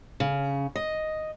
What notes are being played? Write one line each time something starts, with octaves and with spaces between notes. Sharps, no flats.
C#3
D#5